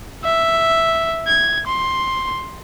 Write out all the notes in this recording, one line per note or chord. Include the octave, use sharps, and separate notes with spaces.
E5
G#6
C6